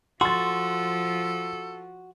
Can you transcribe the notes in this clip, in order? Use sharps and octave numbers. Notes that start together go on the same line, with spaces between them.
F3 F4 F#4 A4 C6 A6